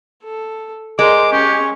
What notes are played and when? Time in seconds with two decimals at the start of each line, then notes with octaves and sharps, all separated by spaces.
0.24 A4
0.99 G#3 A#4 C5 D6
1.32 C#4 G4 C#6